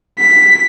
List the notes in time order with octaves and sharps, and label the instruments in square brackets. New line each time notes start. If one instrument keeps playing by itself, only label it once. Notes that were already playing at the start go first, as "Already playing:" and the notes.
[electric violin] B6